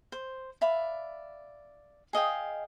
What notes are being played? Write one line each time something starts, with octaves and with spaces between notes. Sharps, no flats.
C5
D5 E5 F5 B5
G#4 D#5 F5 G5